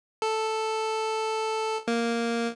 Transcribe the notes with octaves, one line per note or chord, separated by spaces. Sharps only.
A4
A#3